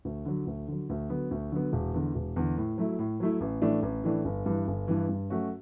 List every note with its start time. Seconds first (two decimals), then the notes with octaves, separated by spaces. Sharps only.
0.05 D2
0.25 D3 F#3
0.47 D2
0.68 D3 F#3
0.90 D2
1.10 D3 F#3 B3
1.31 D2
1.52 D3 F#3 B3
1.73 E1
1.94 E2 D3
2.15 E1
2.36 E2 D3
2.57 A2
2.78 F#3 A3 E4
2.99 A2
3.20 F#3 A3 E4
3.41 A1
3.62 A2 E3 A3 D4
3.83 A1
4.04 A2 E3 A3 D4
4.25 G1
4.46 G2 E3
4.68 G1
4.88 G2 E3
5.09 G2
5.30 F#3 A3 C#4 F#4